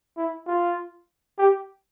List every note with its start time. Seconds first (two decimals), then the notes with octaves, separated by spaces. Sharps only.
0.17 E4
0.47 F4
1.39 G4